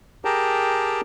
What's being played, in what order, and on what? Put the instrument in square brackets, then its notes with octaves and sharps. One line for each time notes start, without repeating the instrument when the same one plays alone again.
[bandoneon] G4 G#4 A#4 G5 A5 A#5